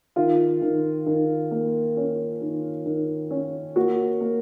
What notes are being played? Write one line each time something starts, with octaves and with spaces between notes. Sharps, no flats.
D#3 F4
D#3
D#3
A#3
C#4
D#3
D#3
C#4
A#3 F#4
A#3